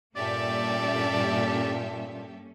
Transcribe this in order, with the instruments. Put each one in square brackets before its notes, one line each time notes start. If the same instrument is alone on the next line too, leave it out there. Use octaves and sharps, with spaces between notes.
[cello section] G2 A#3 C#4 [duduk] A#2 [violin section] G4 A4 E5 [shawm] D5